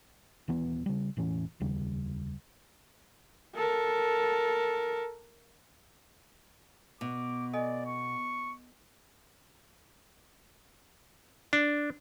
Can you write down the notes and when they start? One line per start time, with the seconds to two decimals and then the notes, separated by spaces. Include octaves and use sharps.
0.48 D#1 E3 B3
0.86 C#3 G3
1.17 E1 A2 E3 C#4
1.60 F1 D#2 C#3 G3
3.55 A4 A#4
7.01 B2 D6
7.53 A4 D5 D#5 G#5
7.86 C#6
11.53 D4